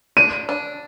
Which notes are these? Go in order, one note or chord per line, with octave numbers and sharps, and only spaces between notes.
D4 D#7
D4